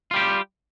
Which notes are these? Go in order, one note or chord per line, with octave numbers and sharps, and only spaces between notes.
G3 F4 G4